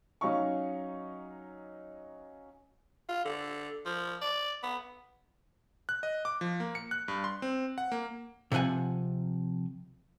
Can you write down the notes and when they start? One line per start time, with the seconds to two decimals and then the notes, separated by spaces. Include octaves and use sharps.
0.21 F#3 C#4 D#4 F5 C#6
3.09 F4
3.25 D3
3.85 F3
4.21 D5
4.63 B3
5.89 F#6
6.03 D#5
6.25 D6
6.41 F3
6.60 A#3
6.75 C#7
6.91 F#6
7.08 G2
7.24 C6
7.42 C4
7.78 F#5
7.92 A#3
8.52 C3 F3 B4 F#5 G#5